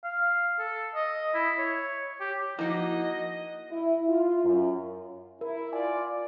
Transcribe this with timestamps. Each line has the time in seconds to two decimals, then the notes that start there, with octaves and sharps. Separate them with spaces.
0.04 F5
0.59 A4
0.95 D#5
1.34 E4
1.58 C#5
2.21 G4
2.59 F3 A#3 D#4 E4 F#4 D#5
3.71 E4
4.07 F4
4.44 F#2
5.41 E4 A#4
5.73 F4 D5 G#5